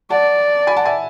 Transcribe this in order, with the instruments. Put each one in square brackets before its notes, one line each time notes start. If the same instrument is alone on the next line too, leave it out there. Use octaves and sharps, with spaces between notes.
[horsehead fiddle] D5 [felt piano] F#5 A5
[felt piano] G#5 B5
F#5 A5
E5 G#5